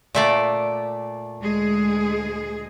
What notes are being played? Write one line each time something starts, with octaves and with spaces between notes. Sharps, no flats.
A#2 A3 D5
D2 G#3 G#4